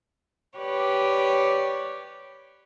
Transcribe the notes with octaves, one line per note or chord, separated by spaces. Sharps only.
G4 B4 C#5 D5